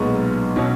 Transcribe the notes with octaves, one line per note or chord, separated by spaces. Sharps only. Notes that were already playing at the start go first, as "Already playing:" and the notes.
Already playing: B1 A#2 G#3 B3 A#5 C#6
B2 F#3 C#4